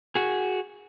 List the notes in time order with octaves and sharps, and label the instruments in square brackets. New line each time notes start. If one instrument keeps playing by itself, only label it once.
[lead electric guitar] F#4 G#4